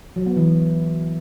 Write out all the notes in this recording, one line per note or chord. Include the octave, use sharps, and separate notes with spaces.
F#3
B3
E3